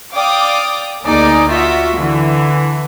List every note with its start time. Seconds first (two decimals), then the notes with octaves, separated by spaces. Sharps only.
0.13 D5 F5 G5 D6 D#6
1.04 D2 A#3 D#4 G#4 D5
1.48 F4 F#4 E5
1.96 D3 E3